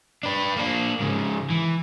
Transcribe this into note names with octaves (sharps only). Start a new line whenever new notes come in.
D4 B4
A#3 D4
G#2 C#3
E3